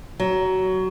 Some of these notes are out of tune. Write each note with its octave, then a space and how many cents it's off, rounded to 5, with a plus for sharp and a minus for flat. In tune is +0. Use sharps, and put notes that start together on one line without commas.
F#3 +20